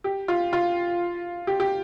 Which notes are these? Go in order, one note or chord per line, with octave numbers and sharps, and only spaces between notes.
G4
F4
F4
G4
G4